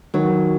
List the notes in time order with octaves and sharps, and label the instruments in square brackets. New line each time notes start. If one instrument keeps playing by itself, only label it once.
[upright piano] D#3 [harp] F#3